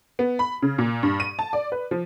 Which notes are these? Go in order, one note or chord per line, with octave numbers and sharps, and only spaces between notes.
B3
B5
C#3
A#2
G2
D#7
A5
D5
B4
F3